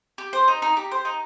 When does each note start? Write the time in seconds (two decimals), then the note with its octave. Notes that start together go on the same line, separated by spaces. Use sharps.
0.18 G4
0.33 C5
0.48 D#4
0.62 D#4
0.77 G4
0.91 C5
1.05 D#4